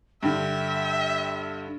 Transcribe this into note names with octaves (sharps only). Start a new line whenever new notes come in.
G2 D3 E5 G5